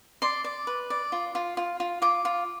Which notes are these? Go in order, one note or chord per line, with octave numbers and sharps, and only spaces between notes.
D5 C6
D5
B4
D5
F4
F4
F4
F4
F4 D6
F4